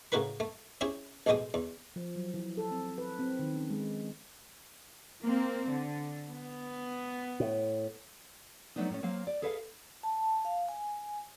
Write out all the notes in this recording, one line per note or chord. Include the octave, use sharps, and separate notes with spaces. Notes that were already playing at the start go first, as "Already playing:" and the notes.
A2 C#3 F#4 A#4 B4 B5
A3
C4 C#4 E4 G4 G#4
A1 F2 B2 G#3 G4 D#6
E2
F3
F#3
E3
A4
C4
B4
C4
D#3
C#4
G#3
A#3 C4
D3
B3
A2
F#3 A3 B3 D4 D#4
A2 C#4
F#3 A#3 C4 F5
D5
G#4 A4 B4 C#5 E5 F5
A5
F5
G#5